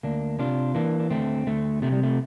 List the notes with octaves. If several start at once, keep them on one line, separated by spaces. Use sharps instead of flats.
D2 A#3 D4
C3 D4 F4
E3 A#3 D4
D4
D2 A3 C4
D2 A3
C3 A3
G3
A3